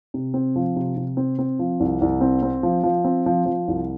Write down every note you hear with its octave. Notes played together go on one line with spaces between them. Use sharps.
C3
C4
F3
C3
C3
C4
C4
F3
C2
C2
C4
C4
F3
F3
C4
F3
F3
C2